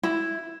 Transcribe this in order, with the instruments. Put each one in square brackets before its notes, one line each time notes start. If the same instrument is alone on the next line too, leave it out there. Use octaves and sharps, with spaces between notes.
[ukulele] E4